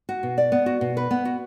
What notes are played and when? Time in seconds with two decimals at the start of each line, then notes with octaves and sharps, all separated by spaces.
0.09 F#4
0.23 B2
0.38 D5
0.52 B3
0.66 F#4
0.81 B2
0.97 B4
1.11 B3
1.25 F#4